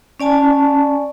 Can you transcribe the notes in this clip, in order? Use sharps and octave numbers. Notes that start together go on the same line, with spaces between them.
C#4 D5 G#5 A5